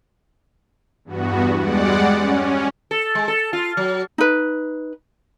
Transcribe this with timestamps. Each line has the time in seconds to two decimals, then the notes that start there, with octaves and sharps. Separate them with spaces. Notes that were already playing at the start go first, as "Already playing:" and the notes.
1.05 E2 G2 B3 F#4
1.59 G3 G#3 D5 F#5
2.15 C#4
2.91 A4
3.15 G#3
3.28 A4
3.53 F4
3.77 F#3
4.18 D#4 B4